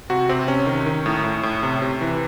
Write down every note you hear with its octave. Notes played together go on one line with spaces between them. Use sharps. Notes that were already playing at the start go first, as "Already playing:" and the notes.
C3 F#4
C3 C4
C3 C#4
D#3
D#3
A2
A2
A2
C3
C3
E3